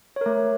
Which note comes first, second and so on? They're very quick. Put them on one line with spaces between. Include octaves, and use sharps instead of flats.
C#5 A#4 A3